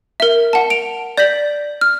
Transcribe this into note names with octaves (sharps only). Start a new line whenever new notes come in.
A#4 E5
F#5 A5
D7 F7
D5 G6 A#6 B6 F#7
F6